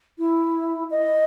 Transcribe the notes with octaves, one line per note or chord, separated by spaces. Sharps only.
E4
D#5